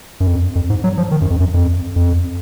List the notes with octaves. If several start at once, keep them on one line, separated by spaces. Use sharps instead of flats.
F#2
F2
F2
G#2
F#3
F3
D#3
F#2
F2
F#2
F2
F2